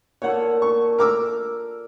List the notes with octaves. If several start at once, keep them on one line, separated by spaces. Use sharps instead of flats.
A#2 A4 C#5 F#5
C#6
A#4 D6 E6